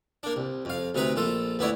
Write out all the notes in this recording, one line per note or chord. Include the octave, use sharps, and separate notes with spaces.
A#3 D4
C2
F2 F5
D2 C3 D#4 B4 A#5
A#1 F4 A4
D2 B3 E4 C#5 D5